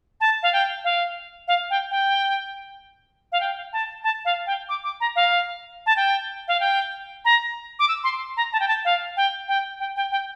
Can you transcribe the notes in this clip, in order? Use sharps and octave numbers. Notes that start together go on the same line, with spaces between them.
A5
F5
G5
F5
F5
G5
G5
F5
G5
A5
A5
F5
G5
D6
D6
A#5
F5
A5
G5
F5
G5
A#5
D6
E6
C6
A#5
A5
G5
A5
F5
G5
G5
G5
G5
G5